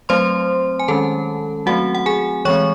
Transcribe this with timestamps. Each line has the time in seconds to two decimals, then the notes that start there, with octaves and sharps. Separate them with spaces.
0.09 F#3 A3 C4 C5 C6
0.80 G#5
0.88 D#3 G#3 C#4 A4 A5
1.66 F#3 A3 C4 F#4 F#5
1.95 F#5
2.06 G#4 G#5
2.45 E3 G#3 C4 C#5 C#6